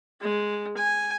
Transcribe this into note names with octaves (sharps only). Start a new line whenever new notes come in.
G#3
G#5